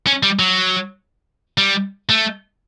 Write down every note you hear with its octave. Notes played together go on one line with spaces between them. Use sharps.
C#4
G3
F#3
G3
A3